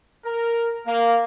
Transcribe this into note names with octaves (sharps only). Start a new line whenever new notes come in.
A#4
A#3